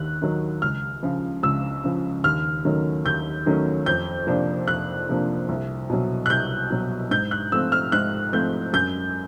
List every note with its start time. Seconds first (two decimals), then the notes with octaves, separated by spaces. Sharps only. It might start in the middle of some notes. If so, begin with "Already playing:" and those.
Already playing: D#2 D#3 F#6
0.22 D#3 F#3
0.62 C#2 F6
1.03 C#3 F3
1.43 C#2 E6
1.84 C#3 F3
2.24 D#2 F6
2.65 D#3 F#3 A3 C#4
3.05 D#2 G6
3.46 D#3 F#3 A3 C#4
3.86 F2 G6
4.27 C3 F3 A#3 D4
4.68 F2 F#6
5.09 C3 F3 A#3 D4
5.49 C2
5.90 B2 F#3
6.26 F#6
6.30 C2 G6
6.70 B2 F#3
7.11 G#2 G6
7.31 F#6
7.52 F3 A3 C4 E6
7.72 F6
7.92 G#2 F#6
8.33 F3 A3 C4 G6
8.73 F#2 G6